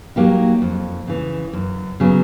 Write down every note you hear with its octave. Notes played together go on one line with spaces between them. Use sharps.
F#3 A#3 D#4 G4
F2
C#3 E3
F#2
C#3 F#3 B3